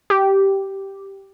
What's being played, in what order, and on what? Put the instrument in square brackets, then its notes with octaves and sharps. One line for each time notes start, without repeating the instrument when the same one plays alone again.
[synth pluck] G4